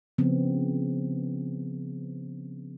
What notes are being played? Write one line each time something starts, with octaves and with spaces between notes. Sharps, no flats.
C#3 F3 B3 C4